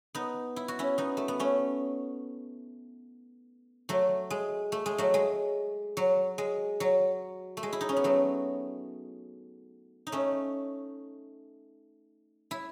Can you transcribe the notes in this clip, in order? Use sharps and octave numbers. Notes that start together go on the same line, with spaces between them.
B3 D#4
E4
F#4
C#4 E4
B3 D#4
A3
B3
A3 C#4
F#3 A3
G#3
A3
G#3
F#3 A3
G#3
F#3
G#3
F#3
A3
G#3
E4
D#4
C#4
B3
F#3 A3
D#4
A3 C#4
E4